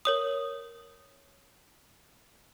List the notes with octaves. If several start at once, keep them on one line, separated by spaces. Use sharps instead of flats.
A#4 C#5 D#6